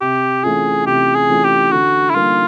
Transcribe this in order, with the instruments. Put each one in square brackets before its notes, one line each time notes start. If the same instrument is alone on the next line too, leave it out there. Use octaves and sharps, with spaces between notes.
[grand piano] C3 [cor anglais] G4
[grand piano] E3 A3 C#4 F4 [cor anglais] G#4
[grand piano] C3 [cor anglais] G4
[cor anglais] G#4
[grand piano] E3 A3 C#4 F4
[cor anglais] G4
[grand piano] D3 [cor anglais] F#4
[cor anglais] E4
[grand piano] G3 A#3 D#4 [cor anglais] F4